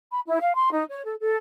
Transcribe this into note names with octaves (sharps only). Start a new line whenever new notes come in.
B5
E4
F5
C6
D#4
C#5
A4
A4